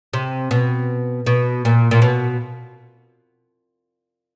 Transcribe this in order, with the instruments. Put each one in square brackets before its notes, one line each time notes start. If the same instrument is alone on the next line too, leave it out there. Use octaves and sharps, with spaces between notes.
[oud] C3
B2
B2
A#2
A#2
B2